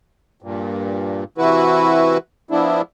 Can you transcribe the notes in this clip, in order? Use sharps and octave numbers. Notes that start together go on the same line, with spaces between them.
G2 A#2
C3 E3 E4 F#4 B4
F3 B3 D4 E4